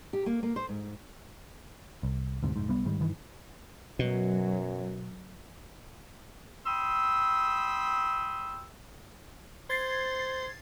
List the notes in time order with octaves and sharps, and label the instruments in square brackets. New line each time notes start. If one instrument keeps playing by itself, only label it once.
[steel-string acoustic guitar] G4
A#3
A#3
C5
G#2
[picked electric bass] C2
D2 G#2 C3
F1 G#2
C2 G3 B3
G#2 D#3 G3
G2 D#3 E3
[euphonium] F#2 [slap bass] B2 [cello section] F#3
[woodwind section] G5 B5 C6 D#6 E6
[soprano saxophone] C5 [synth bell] G#6 A6 C7